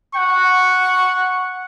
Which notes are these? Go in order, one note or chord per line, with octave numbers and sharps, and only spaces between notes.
F#5 C#6